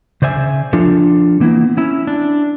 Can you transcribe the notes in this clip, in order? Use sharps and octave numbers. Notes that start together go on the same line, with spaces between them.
C#3 C5 D5 E5 G#5
F3 D4 F4 A4
E3 A#3 B3 E4
C#4 E4
D4